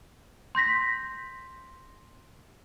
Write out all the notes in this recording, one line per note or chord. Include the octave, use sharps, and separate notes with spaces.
C6 G6 A#6 B6